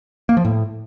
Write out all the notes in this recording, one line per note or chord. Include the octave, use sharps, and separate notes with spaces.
A#3
F3
A2